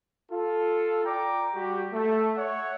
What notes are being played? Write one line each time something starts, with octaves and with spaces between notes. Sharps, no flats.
F4 A4
D5 G5 A#5 D6
G3 F#4 G4
A3
C#5 E5 F#5